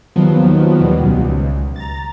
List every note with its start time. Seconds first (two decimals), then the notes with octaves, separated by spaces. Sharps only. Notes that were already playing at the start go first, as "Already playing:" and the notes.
0.16 D#2 D#3 F3 F#3 B3
0.81 B2 F#3 G3
1.03 C#2
1.76 A#5 A6